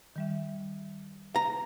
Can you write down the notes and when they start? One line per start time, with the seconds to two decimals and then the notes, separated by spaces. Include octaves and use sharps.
0.16 D#3 G3 E5
1.36 A#5